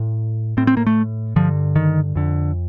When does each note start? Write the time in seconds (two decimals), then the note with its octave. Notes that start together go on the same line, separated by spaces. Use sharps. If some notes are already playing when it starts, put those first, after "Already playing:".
Already playing: A2
0.57 A2 C4
0.67 C4
0.77 A#3
0.87 A3
1.36 G2 D3 F3
1.76 D#3
2.15 F2 D3